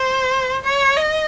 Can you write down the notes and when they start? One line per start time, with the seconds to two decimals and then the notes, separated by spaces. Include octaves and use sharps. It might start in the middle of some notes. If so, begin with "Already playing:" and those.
Already playing: C5
0.65 C#5
0.97 D#5